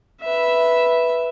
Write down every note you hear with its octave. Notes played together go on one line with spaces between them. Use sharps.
B4 E5